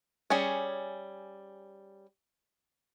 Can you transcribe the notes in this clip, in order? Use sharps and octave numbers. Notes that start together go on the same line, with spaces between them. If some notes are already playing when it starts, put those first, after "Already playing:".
G3 C#4 G#4 C#5